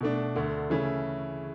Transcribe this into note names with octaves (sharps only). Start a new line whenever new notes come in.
B2 A3 D4
D2 D3 A3
C#3 E3 A3 C#4 E4